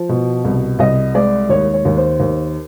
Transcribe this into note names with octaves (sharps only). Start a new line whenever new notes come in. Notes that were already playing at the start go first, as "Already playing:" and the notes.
Already playing: F3
B2
C2
C2 D#5
G#3 D5
D#2 C#5
C#5
D#2
C5
D#2